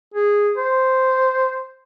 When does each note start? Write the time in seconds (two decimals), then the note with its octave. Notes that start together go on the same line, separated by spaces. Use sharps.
0.14 G#4
0.57 C5